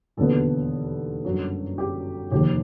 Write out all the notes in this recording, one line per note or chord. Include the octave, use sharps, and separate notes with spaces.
E1 D#2 D3 F#3 B3 A4
G1 F#2 D3 F#3
G4
F1 D#2 D#3 G4